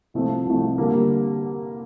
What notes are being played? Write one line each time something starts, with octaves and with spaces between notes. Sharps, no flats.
C2 C3 F3 A3
C2 C3 F3 A3
D3 G3 A#3